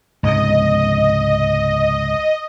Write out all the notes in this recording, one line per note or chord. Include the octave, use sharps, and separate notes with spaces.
C#2 G#2 C3 D#5